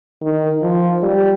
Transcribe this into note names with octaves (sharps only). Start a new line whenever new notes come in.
D#3
F3
G3